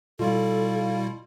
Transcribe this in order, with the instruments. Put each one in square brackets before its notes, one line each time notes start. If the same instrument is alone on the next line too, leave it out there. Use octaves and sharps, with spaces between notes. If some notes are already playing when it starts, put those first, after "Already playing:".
[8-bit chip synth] B2 G3 E4 [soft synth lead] F4 [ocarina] A4